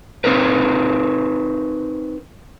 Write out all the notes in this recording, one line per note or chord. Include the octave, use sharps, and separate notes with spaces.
C4 D#4 A#4 B4